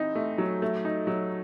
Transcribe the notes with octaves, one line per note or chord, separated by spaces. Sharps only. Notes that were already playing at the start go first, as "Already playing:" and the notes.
Already playing: E3 C4 D#4
A3
F#3
A3
D#4
F#3